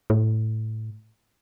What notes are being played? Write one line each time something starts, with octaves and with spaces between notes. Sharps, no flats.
A2